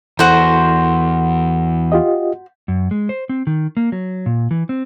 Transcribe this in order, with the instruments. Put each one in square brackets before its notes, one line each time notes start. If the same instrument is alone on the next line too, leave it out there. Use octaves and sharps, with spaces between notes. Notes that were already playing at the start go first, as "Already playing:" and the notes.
[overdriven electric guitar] E2 [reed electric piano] E4 A4 [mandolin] F#4 C5
[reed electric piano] F4 G4 D#5
[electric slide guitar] F#2
G#3
C5
C4
D#3
A#3
F#3
A#2
E3
C4